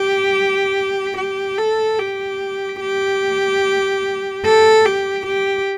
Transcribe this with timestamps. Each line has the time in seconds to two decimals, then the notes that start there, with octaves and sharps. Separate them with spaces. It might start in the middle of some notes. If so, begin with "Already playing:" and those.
Already playing: G4
1.17 G4
1.58 A4
1.99 G4
2.81 G4
4.45 A4
4.85 G4
5.26 G4